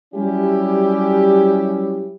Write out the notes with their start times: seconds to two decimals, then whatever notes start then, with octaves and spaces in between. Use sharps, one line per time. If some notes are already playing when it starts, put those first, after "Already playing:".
0.14 F#3 G3 C#4 E4 G4